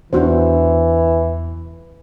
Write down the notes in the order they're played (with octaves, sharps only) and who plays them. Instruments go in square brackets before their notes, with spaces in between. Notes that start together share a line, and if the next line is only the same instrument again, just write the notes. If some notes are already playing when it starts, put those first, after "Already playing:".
[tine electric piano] E2 [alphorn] E3 [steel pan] D4 F#4 C5